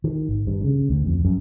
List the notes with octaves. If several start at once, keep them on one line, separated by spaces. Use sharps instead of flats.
D#3
G#1
G2
C#3
D2
F2
F#2